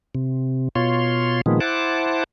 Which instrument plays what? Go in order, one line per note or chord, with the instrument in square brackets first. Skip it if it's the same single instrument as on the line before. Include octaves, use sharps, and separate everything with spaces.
[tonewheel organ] C3
B2 F4 C#5 C6
A#2 D#3 F3 G#3 B3
E4 C5 F#5 A5 D6